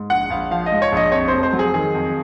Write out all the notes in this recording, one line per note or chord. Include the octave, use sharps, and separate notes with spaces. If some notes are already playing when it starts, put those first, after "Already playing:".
Already playing: G#2
A#1 F#5
A#1 F5
F3 F5
D#5
G#2
C#5
A#1 D#5
F2 C#5
F1 C5
C5
F#3
G#4
D#3 G#4
F2